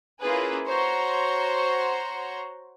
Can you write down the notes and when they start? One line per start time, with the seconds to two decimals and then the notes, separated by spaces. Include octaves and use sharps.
0.21 A#3 C#4 E4 F4 G#4 B4
0.67 F#4 C5 C#5 A#5 C6 C#6